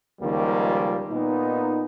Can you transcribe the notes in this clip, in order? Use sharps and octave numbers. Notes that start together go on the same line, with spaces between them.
C#2 D#3 F3 G3 A#3
A#2 B3 D#4